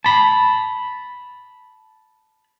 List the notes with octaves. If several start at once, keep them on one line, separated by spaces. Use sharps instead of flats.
A5 B5